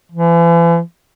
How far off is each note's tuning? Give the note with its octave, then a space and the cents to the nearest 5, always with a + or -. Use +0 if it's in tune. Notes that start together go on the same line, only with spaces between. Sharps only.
E3 +40